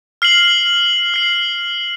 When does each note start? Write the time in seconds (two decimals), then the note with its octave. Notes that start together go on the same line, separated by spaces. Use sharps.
0.22 F6 C7 F#7
1.14 F6 C7 F#7